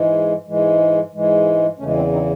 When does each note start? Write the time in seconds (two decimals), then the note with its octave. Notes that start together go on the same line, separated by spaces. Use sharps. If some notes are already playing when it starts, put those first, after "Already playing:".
Already playing: G#2 E3 G#3
0.47 G#2 E3 G#3
1.13 G#2 E3 G#3
1.79 E2 C#3 E3 G#3 A3 C#4
1.96 G#3 C4
2.13 C4 D#4